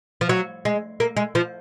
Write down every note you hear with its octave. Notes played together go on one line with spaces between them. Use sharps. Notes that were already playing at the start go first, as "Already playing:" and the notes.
F3
F#3
G#3
A#3
G#3
F3